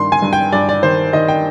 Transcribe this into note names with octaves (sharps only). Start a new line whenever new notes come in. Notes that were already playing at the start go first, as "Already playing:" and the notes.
Already playing: G2 D#3 C6
G#5
G2
G5
G2 D5
D5
D#3 C5
D#3 D#5
G5